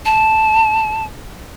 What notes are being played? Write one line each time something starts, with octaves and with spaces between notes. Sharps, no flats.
A5